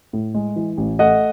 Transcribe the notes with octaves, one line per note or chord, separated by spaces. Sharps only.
A2
G#3
E3
A1
A3 D#5 F#5